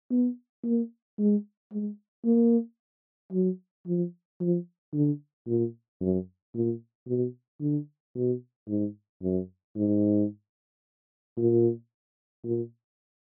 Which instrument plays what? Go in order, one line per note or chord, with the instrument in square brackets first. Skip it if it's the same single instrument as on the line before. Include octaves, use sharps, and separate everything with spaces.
[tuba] B3
A#3
G#3
G#3
A#3
F#3
F3
F3
D3
A#2
F#2
A#2
B2
D3
B2
G#2
F#2
G#2
A#2
A#2